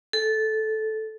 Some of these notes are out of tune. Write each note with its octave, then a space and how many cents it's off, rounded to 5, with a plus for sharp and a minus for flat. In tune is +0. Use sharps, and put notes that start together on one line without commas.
A4 -10